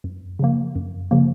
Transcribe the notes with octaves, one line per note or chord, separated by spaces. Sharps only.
F#2
C#3 F3 A#3
F#2
C#3 F3 A#3